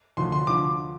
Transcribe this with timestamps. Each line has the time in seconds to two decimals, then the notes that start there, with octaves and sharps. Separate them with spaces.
0.17 D2 D3 F3 C6
0.32 C6
0.47 D3 F3 D6